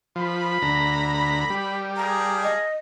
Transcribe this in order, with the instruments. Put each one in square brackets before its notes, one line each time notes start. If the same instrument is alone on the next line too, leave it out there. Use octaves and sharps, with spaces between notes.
[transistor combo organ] F3 [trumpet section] B5
[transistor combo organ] D2 A#5
G3
[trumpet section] G#4 F5 A5 [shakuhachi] A#5
[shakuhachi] D#5